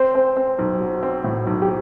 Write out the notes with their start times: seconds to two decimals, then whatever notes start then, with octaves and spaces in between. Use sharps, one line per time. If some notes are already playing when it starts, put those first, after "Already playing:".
Already playing: C4 C5
0.15 C4
0.37 C4
0.59 B1
0.81 F#3
1.03 C4
1.24 A2
1.47 B1
1.62 G4